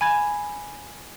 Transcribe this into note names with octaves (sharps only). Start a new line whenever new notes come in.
G#5 B5 G#6